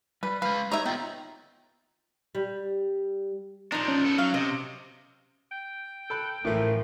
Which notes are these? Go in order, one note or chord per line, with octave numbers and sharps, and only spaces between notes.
G3 B4
G#3 B4 F5
D#4 C#5 E5 A#5
B3 F4 G5
G3
F3 D4 D#4 C#5
C#4
B3 A4
F#3 F5
C3 D#5
G5
A4 B5 F#6
A1 A2 E3 F3 A3 A#4